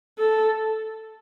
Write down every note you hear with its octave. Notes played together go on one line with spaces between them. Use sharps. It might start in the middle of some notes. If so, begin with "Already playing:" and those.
A4